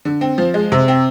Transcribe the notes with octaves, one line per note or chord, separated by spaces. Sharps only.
D3
C4
F3
G#3
C3
C4